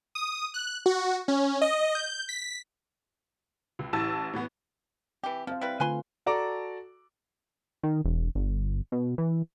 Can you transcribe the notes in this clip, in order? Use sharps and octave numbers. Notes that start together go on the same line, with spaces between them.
D#6
F#6
F#4
C#4
D#5
G6
B6
C#2
A1 E3 A5 E6 A6
A2 E3 B3
E3 C4 G4
F3 C4 C5 F5
G3 E4 B4
D3 A3 F4 B4 G#5 C6
F#4 A4 D5 A5 A#5 D6
D#3
E1
G1
B2
E3